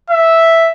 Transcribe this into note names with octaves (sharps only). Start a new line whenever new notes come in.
E5